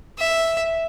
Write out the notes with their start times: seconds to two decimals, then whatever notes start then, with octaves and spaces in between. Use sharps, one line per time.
0.18 E5